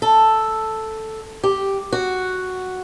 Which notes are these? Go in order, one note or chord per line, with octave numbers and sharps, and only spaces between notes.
A4
G4
F#4